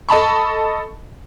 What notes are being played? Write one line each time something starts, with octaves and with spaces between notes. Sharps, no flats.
A4 D#5 A5 B5 C#6